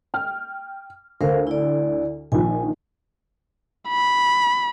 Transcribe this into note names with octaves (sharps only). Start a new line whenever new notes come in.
G5 F6
D2 A#4 C5 F5
E4 D5
A#1 D#3 F3 G#5
B5